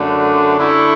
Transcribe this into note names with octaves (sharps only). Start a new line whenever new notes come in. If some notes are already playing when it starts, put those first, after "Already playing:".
Already playing: F#2 D3 A3 D4
D3 A3 E4